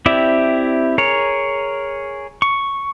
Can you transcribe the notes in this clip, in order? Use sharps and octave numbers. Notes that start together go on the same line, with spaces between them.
C4 E4 G4 D5 E5
G#4 A#4 C#5
C#6